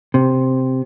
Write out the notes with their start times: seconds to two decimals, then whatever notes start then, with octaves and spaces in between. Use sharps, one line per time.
0.14 C3